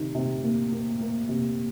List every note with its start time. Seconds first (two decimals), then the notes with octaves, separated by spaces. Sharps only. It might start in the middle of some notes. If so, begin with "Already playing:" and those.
Already playing: C3 D#3
0.15 C3
0.43 A#3
0.72 A#3
1.01 A#3
1.29 C3